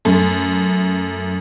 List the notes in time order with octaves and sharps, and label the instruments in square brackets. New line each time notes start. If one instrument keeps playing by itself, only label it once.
[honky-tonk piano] F#2 A3